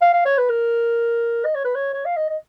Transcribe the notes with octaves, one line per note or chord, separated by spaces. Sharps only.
F5
F5
C#5
B4
A#4
D#5
C#5
B4
C#5
C#5
F5
D#5
D#5